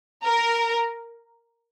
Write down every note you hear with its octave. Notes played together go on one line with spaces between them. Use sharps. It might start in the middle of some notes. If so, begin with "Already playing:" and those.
A#4